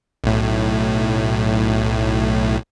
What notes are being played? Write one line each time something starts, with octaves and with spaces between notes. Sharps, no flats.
B1 A2